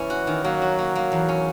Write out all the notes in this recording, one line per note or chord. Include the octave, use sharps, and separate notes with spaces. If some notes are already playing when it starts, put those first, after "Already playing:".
Already playing: E3 C#4
F#4
D#3
F#3 A#3
F#4
A#3
A#3
E2
C#4